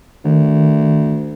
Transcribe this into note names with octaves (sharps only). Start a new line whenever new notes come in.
D2 D#3